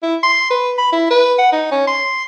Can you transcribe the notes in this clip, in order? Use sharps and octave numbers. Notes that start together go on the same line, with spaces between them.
E4
C6
B4
B5
E4
B4
F#5
D#4
C#4
C6